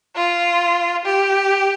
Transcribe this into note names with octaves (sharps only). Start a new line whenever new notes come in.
F4
G4